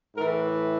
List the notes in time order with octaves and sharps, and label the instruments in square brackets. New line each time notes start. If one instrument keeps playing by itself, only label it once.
[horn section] A2 E3 A#4